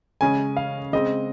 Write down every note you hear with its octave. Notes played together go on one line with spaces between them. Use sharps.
C#3 G#3 C#4 G#5
F5
C#3 G#3 C4 D#5